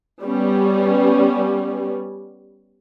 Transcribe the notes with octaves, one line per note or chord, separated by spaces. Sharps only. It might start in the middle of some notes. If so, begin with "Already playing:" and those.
G3 B3 C#4